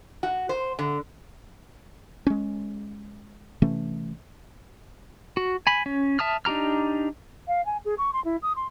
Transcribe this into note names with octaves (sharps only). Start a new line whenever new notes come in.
F#4
C5
D3
G#3 C#4
C3 E3 A3 C#4
F#4
G#5 B5
C#4
E5 A5 D#6 F6
D4 D#4 G4 A#5 F6
F5
G#5
G#4
C#6
C6
E4
D#6
C6